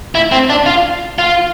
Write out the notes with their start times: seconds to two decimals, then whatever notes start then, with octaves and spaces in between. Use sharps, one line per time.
0.15 E4
0.32 C4
0.49 D4
0.66 F4
1.18 F4